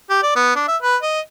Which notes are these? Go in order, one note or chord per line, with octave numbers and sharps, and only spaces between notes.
G4
D5
B3
D4
E5
B4
D#5